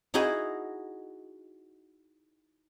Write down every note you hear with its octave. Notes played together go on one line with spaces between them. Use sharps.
D#4 E4 F#4 G#4 D#5